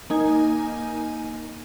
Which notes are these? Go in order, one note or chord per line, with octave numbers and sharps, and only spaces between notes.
A#3 D#4 G#5